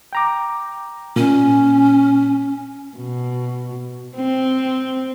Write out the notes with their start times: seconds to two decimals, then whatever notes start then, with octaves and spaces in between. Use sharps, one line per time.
0.13 G5 A#5 D6
1.16 A#2 C#4
2.97 B2
4.15 C4